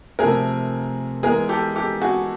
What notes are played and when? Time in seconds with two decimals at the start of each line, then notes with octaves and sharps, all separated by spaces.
0.19 C3 F3 A3 G#4 A#4
1.23 E3 G#3 B3 G#4 A#4
1.49 G4 A4
1.75 G4 A4
2.02 F#4 G#4